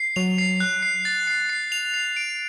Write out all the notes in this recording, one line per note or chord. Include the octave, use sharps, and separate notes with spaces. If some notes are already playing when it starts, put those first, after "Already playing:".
Already playing: C7
F#3 F7
C7
F#6
C7
A6
C7
C7
F7
C7
D7